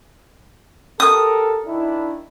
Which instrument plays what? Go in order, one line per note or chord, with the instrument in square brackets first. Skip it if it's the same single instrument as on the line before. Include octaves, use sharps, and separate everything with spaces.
[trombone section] G4 A4 A#4 [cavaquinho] D#6
[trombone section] D#3 D4 E4